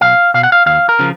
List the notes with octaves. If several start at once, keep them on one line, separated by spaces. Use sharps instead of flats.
B1 F5
B2 F5
F#5
F5
D#2 F5
A#4
C#3 F3